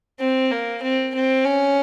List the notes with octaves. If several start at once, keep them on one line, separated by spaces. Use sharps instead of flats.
C4
A#3
C4
C4
C#4